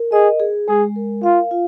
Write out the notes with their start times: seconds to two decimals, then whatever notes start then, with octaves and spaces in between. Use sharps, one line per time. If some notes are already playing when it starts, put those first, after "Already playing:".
Already playing: A#4
0.12 G#4 D#5
0.40 G#4
0.68 G#3 G#4
0.96 A#4
1.23 F4 F5
1.51 F4